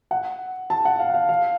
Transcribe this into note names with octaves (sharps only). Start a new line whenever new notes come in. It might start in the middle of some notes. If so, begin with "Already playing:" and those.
F#5
A5
F#5
F5
F#5
F5
F5